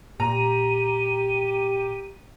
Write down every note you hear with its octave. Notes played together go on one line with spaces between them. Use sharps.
A#2 G4 A#5 D#7